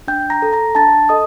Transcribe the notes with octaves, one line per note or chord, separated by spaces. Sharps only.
D4 G5 G6
A#5 A#6
A4
A#5 A#6
D4 A5 A6
A4 D#5 D#6